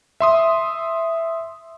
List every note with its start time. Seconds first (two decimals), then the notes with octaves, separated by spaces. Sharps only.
0.20 E5 C6 D#6